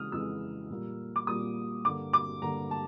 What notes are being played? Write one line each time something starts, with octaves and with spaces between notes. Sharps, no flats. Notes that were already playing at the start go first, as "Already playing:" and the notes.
Already playing: C#3 E3 G#3 D#6 F6
F2 C#3 E3 G#3 E6
A#2 G3 A#3
D6
A#2 G3 A#3 D#6
G2 D3 G3 A#3 D6
D6
G2 D3 G3 A#3 A#5
A5